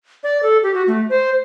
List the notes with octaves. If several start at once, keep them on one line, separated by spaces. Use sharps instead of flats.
D5
A4
G4
F#4
A3
C5